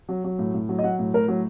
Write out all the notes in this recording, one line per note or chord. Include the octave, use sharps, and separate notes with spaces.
F#3
F#3
A2
A2
F#3
D#5
F#3 F#5
A2
A2 A#4
F#3